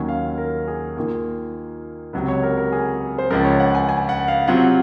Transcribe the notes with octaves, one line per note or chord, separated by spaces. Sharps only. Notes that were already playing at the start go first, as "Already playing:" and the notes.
Already playing: D#2 D#3 F#3 C#4
F5
A#4
G#4
D#2 D#3 A#3 F4
C#2 C3 F#3 C4
C#5
A#4
A#4
G#4
C5
C#2 C#3 F3 A#4
C#5
F#5
G#5
G#5
F#5
F5
C3 F#3 C4 F4 F#5